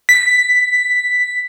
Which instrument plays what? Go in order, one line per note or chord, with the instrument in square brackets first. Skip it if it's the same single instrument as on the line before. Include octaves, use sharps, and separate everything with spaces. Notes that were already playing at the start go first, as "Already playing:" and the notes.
[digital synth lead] B6